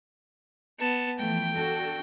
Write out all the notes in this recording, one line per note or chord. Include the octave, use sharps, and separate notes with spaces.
B3 A5
E3 F3 A3 G5
D4 F#4 A4